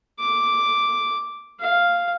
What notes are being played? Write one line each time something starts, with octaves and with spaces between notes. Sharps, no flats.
D6
F5